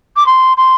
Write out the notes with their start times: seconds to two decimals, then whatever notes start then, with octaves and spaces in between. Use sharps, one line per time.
0.16 D6
0.26 C6
0.57 C6